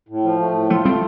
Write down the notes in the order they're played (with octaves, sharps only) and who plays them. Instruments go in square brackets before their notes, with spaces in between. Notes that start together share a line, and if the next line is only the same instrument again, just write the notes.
[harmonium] A2
F3
A3
A2
[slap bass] F3 A3 [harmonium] F4
[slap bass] G3 C4 [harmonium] A3